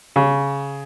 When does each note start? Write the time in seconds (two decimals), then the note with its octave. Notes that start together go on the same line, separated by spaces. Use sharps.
0.16 C#3